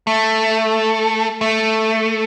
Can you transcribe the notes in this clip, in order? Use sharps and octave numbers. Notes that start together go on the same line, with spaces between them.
A3
A3